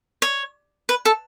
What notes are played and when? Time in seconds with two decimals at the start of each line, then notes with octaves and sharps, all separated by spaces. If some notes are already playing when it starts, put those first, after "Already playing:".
0.22 C#5
0.89 B4
1.05 A4